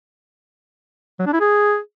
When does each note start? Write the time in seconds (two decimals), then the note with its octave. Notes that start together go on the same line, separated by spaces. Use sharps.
1.19 F#3
1.26 D4
1.33 E4
1.40 G#4